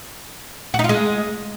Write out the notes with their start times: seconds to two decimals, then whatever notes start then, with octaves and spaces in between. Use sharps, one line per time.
0.74 F#4
0.79 D#4
0.84 F4
0.89 G#3